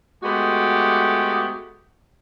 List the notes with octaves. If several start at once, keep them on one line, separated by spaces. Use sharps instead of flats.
G#3 A3 B3 F#4 G4